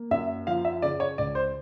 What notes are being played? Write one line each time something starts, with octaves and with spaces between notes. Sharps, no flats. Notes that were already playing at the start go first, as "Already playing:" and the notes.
Already playing: A#3
F#2 E5
F3 F5
E5
C#3 D5
C#5
C#2 D5
C5